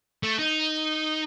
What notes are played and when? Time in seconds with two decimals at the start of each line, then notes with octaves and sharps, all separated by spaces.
0.23 A3
0.39 D#4